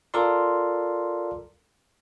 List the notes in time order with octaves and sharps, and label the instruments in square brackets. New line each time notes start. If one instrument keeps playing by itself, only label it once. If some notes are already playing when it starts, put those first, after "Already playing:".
[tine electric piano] F4 A4 A#4 D5 C6